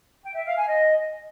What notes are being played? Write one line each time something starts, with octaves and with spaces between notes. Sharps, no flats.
G5
E5
F5
G#5
D#5